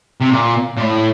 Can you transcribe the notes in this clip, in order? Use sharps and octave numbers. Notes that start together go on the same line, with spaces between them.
C3
A#2
A#2
A2